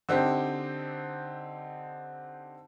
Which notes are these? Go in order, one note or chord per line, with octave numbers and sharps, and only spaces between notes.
D3 C4 D#4 G4